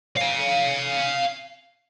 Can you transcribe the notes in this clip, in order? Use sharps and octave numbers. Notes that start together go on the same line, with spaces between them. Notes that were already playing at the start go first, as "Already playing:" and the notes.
F5 G#5